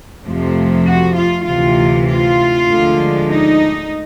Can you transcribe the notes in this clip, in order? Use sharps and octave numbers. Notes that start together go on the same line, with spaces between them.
F2 C3 F3 A3
F#4
F4
D2 C3 E3 F4
F4
D2 D3 F3 G#3
D#4